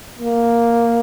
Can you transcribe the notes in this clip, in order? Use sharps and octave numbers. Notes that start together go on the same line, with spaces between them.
A#3